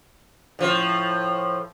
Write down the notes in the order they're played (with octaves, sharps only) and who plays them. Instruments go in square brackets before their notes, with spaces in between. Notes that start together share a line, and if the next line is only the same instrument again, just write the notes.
[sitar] A2 F3